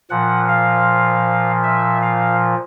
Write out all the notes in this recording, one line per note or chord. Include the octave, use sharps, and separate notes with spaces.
A#2 F3 F#5
F5
E5
F5